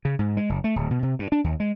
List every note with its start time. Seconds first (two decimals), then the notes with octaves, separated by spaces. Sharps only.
0.05 C#3
0.19 G#2
0.37 G#3
0.49 F#1
0.64 A3
0.76 D1
0.91 B2
1.03 C3
1.19 G2
1.32 D4
1.44 D#2
1.60 G#3